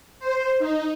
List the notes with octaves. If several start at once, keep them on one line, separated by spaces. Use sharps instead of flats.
C5
D#4